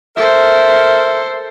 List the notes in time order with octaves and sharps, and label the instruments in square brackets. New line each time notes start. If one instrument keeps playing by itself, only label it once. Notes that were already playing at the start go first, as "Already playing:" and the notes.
[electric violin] A4 C5 [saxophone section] A#4 E5